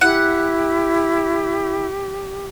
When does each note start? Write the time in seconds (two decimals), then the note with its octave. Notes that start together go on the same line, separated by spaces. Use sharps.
0.01 E4 G4 F#5